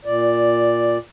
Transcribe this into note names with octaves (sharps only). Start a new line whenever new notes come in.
A#2 D5